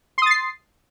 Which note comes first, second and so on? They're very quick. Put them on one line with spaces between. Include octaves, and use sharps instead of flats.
C6 D#6 A6 C7